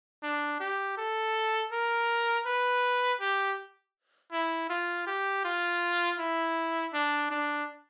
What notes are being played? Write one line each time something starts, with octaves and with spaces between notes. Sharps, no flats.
D4
G4
A4
A#4
B4
G4
E4
F4
G4
F4
E4
D4
D4